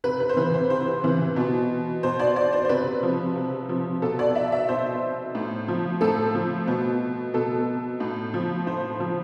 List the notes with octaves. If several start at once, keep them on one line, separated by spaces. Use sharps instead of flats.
C3 B4
B4
C5
E3 B4
C5
C3 C5
E3
B2
B2 C5
D5
D5
C5
C5
C3 B4
F3
C3
F3
B2 A4
D5
E5
E5
B2 C5
A2
F3
A2 A4
F3
B2
B2 A4
A2
F3
A2 C5
F3